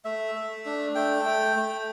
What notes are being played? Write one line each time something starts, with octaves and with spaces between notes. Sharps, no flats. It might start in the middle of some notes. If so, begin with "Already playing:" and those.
A3 E5
A3
D4
A3 G5
A3
A3